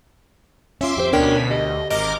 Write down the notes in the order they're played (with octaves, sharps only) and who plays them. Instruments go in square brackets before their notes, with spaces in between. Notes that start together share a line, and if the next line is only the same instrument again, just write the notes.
[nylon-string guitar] C#4 F4 [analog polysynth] E5 C6 D6
[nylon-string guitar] F2 G4 C5
[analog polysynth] D2 B2 B6 [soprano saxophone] C#4 [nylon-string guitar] D4 A#4 G5
[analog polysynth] D2 [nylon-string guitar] G4 [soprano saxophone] D#5
[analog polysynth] G#1 A#4 D6 [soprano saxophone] D#5